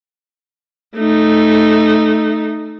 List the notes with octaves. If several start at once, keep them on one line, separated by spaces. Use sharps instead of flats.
A3 D#4